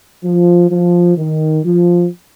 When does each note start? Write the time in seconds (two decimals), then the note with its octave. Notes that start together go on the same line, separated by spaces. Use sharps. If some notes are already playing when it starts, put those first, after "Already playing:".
0.24 F3
0.70 F3
1.17 D#3
1.64 F3